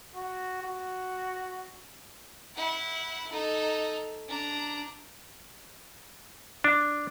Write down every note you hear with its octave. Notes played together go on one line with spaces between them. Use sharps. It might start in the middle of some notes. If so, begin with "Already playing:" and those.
F#4
F#4
E4 F#5
D#4 A4
D4 A#5
D4